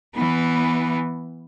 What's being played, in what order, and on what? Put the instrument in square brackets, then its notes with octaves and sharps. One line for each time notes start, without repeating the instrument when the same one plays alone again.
[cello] E3 B3